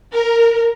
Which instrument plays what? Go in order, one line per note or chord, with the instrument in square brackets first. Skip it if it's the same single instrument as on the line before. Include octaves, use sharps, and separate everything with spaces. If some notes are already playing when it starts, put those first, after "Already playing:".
[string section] A#4